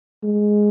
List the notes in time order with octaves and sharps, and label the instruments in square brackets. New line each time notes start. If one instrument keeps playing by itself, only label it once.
[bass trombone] G#3